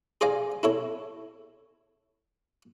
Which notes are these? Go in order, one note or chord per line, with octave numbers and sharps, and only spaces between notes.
G#4 C5 D5 F5 G#5 A#5
E4 A4 C#5